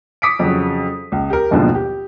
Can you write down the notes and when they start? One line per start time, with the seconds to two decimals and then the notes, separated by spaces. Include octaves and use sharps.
0.22 D6 D#6 B6 C#7 D7
0.39 F2 C#3 F#3
1.12 C#2
1.30 G4 A#4
1.51 F#1 D#2 G#2 B2 D3 F3
1.75 G4